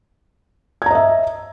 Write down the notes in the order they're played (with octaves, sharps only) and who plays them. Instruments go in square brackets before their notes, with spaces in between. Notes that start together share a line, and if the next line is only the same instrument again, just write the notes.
[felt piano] G#6
A#5
D#5
E5